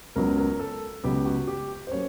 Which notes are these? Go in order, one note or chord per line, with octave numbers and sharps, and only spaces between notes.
C#2 C#3 F#3 B3 A#4
A#4
A4
C#2 C#3 F#3 B3 G4
F#4
G4
C5
F#3 A#3 C#4 C#5